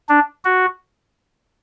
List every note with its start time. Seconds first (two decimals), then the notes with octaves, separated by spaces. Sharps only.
0.09 D4
0.45 F#4